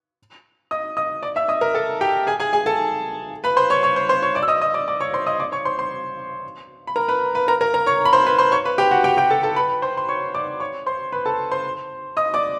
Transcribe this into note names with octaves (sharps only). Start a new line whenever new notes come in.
D#5 D#6
D#5 D#6
D5 D6
E5 E6
D#5 D#6
A#4 A#5
A4 A5
G4 G5
G#4 G#5
G#4 G#5
G#4 G#5
A4 A5
B4 B5
C5 C6
C#5 C#6
C#5 C#6
C5 C6
C5 C6
C#5 C#6
D5 D6
E6
D#5 D#6
D#5 D#6
D5 D6
D5 D6
C#5 C#6
C5 C6
D#5 D#6
D5 D6
C#5 C#6
C5 C6
C5 C6
B5
A#4 A#5
B4 B5
B4 B5
A#4 A#5
A#4 A#5
A#4 A#5
C#5 C#6
B5
C5 C6
B4 B5
C5 C6
C#5 C#6
B4 B5
G4 G5
F#4 F#5
G4 G5
G4 G5
A4 A5
A4 A5
B4 B5
C5 C6
C6
C#5 C#6
D5 D6
C#5 C#6
C5 C6
B4 B5
A4 A5
C5 C6
D#5 D#6
D5 D6